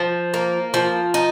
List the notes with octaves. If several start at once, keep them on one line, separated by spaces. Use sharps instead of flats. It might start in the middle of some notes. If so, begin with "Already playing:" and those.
Already playing: F3
A#3
F3
D#4